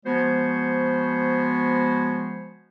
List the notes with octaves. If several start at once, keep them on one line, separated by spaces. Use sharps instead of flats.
F3 G#3 B3 F#4 C5 C#5